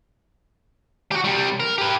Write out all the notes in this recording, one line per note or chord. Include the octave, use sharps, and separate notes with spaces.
F#4 G4
C3 G3
A#4
G4 B4